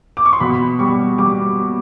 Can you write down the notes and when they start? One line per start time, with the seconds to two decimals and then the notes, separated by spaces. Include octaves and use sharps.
0.17 D6
0.25 C#6
0.33 C6
0.40 B2 B5
0.79 G3 C#6
1.18 G3 D6